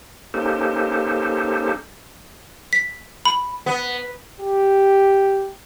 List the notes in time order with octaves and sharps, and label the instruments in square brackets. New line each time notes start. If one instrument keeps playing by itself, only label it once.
[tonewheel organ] A#3 C#4 D#4 G4 A4 C5
[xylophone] B6
B5
[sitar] B3
[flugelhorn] G4